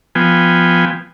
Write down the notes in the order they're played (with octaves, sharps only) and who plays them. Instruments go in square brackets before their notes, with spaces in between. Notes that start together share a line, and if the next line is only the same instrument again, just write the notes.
[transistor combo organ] F3 B3 G5 G#5